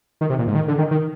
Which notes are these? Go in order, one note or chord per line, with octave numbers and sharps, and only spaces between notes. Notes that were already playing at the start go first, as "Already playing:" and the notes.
D#3
C3
A#2
G#2
D#3
D3
D#3
D#3